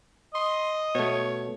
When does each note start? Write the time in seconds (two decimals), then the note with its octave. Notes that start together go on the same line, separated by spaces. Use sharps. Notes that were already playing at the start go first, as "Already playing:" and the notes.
0.35 D#5 C6
0.95 B2 A3 C#5